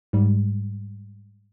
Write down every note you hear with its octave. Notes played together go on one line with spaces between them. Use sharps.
G#2 G3